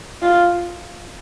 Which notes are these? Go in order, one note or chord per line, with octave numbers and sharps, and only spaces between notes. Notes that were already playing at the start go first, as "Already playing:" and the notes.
F4